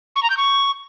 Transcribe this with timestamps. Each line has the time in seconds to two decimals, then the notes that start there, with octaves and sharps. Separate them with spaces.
0.16 C#6
0.23 A#5
0.30 G6
0.37 C#6